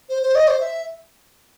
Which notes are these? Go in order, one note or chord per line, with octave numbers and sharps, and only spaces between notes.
C5
C5
D#5
C5
E5